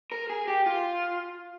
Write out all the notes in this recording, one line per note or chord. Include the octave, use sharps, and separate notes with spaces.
A#4
G#4
G4
F4